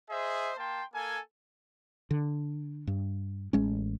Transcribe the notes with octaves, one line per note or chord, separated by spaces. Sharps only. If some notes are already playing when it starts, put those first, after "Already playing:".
G#4 C5 D#5 E5
A#3 G5 A5 C6
A#3 A4 G#5
D3
G2
A1 G#3 C#4